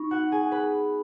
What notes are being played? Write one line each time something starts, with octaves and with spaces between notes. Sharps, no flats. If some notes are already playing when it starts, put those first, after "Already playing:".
Already playing: D#4 B5 C#6
B3 F#4 F#5
G#4 G#5
B4 B5